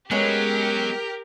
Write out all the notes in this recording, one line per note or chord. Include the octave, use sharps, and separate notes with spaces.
F#3 G#3 B3 C#4 G4 A#4